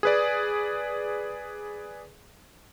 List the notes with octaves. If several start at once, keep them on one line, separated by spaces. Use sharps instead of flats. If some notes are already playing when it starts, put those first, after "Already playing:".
G#4 B4 D5